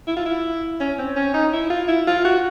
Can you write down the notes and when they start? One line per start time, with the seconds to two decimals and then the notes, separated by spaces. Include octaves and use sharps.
0.08 E4
0.16 F4
0.26 E4
0.80 C#4
0.99 C4
1.16 C#4
1.34 D#4
1.53 E4
1.70 F4
1.88 E4
2.07 F4
2.25 F#4